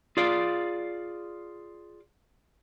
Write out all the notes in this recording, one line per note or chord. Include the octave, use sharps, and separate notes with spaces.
F4 G#4 D5 F5